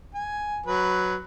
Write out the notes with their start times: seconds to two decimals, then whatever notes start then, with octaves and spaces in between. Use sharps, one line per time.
0.14 G#5
0.66 F#3 B4